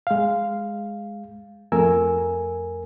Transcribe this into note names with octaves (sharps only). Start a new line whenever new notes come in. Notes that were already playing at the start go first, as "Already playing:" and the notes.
G#3 F5
F2 A3 A#4 G#5 E6